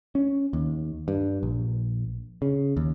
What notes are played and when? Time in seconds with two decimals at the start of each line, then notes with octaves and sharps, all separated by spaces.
0.15 C#4
0.53 D#2
1.08 G2
1.43 A#1
2.42 C#3
2.77 D#2